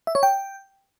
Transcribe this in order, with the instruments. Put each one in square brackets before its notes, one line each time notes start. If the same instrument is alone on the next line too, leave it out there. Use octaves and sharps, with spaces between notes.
[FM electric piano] E5
C#5
G5